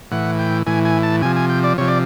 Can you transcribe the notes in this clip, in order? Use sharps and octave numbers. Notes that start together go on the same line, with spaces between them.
A2 E3 F#5
G5
A2 E3 G#5
G#5
A5
C3 F3 G#5
G#5
G5
D5
C3 F3 C#5
D5